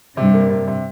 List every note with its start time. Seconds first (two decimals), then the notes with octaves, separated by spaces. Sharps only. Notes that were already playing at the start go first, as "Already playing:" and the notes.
0.17 G2 C3 G3
0.34 A#3
0.50 C3
0.68 C3